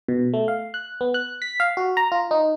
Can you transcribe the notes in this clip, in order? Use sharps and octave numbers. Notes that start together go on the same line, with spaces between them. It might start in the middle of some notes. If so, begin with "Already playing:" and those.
B2
A3
F5
F#6
B3
F#6
B6
F5
F#4
A#5
F4
D#4